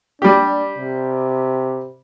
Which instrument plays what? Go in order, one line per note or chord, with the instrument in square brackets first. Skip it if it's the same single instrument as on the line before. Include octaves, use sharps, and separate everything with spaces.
[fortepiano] G3 G4 [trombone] D4
[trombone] C3